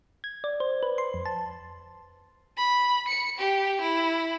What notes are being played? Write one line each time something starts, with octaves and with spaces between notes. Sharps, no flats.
G#6
D5
C5
B4
C6
F2
A5
B5
C#7
G4
E4